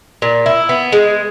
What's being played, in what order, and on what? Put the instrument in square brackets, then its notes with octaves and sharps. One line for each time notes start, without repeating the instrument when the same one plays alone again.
[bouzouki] A#2
E4
B3
G#3